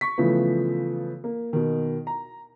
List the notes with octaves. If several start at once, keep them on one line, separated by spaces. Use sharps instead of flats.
C#6 B6
C#3 E3 F3 A3 B3
A#3
B2 D#3
A#5